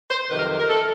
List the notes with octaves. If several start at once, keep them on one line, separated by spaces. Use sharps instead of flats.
C5
F2 C3 D#3 F#3 B4
A#4
A#4
A4